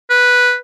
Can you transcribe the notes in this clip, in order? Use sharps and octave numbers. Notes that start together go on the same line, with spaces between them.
B4